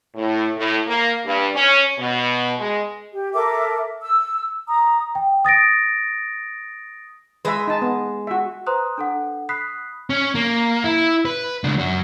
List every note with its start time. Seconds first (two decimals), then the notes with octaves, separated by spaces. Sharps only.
0.16 A2
0.57 A2
0.87 A#3
1.26 G2
1.56 C#4
1.99 B2
2.59 G#3
3.12 G4
3.34 A4 A#4 E5 D6
4.02 E6
4.67 A#5 D#6
5.15 G5
5.45 D#6 A6 A#6 D7
7.45 G#3 B4 D#5 E5
7.68 D#4 A5
7.82 B3
8.27 F#4 E5
8.66 B4 C5 A#5 C6 D#6 F#6
8.98 D4 A4 F#5
9.49 B5 D#6 F#6 B6 C7
10.10 C#4
10.35 A#3
10.84 E4
11.25 B4
11.64 C#2 D4
11.78 F#2 F#4